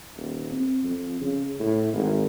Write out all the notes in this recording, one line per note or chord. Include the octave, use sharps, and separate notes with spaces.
D#1
C4
F2
C#3
A2
G#1